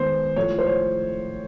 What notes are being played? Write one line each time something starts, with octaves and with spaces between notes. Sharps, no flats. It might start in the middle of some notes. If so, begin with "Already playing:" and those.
Already playing: D#3 G#3 B3 C5
A2 F3 A3 C#5
C5
C#5